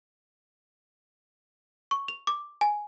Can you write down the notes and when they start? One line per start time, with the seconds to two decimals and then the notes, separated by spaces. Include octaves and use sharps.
1.91 C#6
2.08 F7
2.27 D6
2.61 G#5